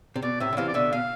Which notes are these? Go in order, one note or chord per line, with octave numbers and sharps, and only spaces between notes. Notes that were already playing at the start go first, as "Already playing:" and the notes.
C3
B2 D5
A2 C3 E5
D3
C3 E3 F5
D5
B2 D3 E5
B2 F5